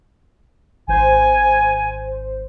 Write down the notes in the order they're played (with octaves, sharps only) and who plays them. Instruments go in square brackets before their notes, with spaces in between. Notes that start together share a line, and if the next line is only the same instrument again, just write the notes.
[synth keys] G#1 C5 [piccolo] G#5